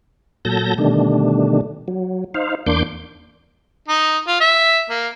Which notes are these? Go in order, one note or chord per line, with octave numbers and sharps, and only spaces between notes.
A#2 F#3 A4 A5 G6 A#6
B2 D3 D#3 G3 A3 D4
F#3
D#4 C5 F5
E2 A#3 D4 C6 D6 G6
D#4
F4
E5
A#3